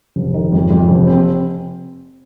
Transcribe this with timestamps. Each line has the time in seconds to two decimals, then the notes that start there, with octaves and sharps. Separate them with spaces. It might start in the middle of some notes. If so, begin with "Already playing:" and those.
0.16 F1
0.34 D#3
0.52 F2
0.71 F2
0.89 F1
1.07 C4